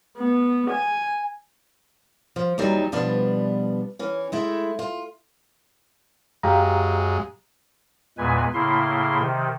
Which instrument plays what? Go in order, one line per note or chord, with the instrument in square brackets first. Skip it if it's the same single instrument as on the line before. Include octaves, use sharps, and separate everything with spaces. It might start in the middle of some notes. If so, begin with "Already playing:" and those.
[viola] B3
G#5
[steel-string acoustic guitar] F3
D#2 E3 F#3 G3 D#4
B2 F3 G3 B3 D4
E3 C#4
G#3 A3 E4
F4
[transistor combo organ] F#2 G#3 [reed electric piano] G4 F5 A#5
[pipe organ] E2 A#2 G#3 B4 G#5
A2 C#3 A#3 E4 C6
C3 D#3